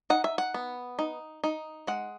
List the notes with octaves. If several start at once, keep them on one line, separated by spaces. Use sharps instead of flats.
D#4 F#5
E5
F#5
B3
D#4
D#4
G#3 F#5